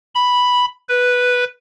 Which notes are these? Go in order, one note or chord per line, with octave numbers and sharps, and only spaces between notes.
B5
B4